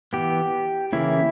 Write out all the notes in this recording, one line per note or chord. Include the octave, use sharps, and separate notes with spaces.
E3 B3 G4
C#3 E3 A#3 C#4 E4